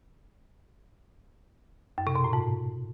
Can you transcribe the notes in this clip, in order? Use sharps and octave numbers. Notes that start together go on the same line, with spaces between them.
F#2
C3
B2
A2
G#2